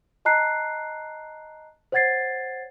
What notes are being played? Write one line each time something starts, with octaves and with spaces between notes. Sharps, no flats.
D#5 A5 A#5 F#6 C7
C5 C#5 F#5 G#6 A6 C7